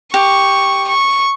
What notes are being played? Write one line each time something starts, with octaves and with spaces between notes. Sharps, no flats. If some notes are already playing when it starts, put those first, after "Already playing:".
G4 C#6
C#6